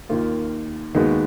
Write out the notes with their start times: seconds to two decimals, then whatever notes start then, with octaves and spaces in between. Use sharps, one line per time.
0.09 D#2 D#3 A#3 F4
0.95 D#2 D#3 G#3 B3 F#4